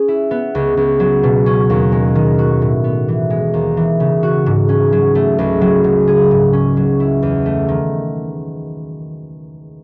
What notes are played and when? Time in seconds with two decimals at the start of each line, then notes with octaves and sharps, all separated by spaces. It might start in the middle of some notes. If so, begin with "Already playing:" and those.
Already playing: C#4 G#4
0.08 E4
0.31 B3
0.55 C#2
0.77 C#2
1.00 F#3
1.23 B2
1.46 C#4
1.70 D#2
1.92 G#3
2.15 D#3
2.39 F#4
2.62 A2
2.84 B3
3.08 E3
3.30 G#3
3.54 D#2
3.77 E3
4.00 C#3
4.23 F#4
4.46 G#2
4.69 C#4
4.92 F#3
5.15 A3
5.38 C#2
5.61 F#3
5.84 C#3
6.08 G#4
6.31 G#2
6.53 C#4
6.77 F#3
7.00 E4
7.22 E2
7.46 A3
7.68 D#3